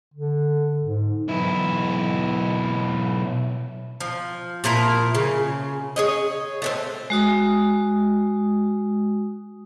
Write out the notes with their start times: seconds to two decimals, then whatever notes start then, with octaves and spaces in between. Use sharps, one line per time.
0.14 D3
0.82 G#2
1.28 B1 E4
4.00 F3
4.64 A#2 F3 E4 A#4
5.15 C#3
5.96 G#4 C#5 D#5
6.62 A3 B3 C4
7.10 G#3 F#4 D#6